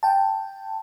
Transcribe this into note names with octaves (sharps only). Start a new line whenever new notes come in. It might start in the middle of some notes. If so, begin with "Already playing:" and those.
G5 A5